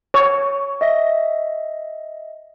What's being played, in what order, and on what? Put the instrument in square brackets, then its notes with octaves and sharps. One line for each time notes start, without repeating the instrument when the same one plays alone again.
[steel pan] C#5
[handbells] D#5 E5 A#6